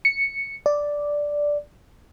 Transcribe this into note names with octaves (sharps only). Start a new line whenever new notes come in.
C#7
D5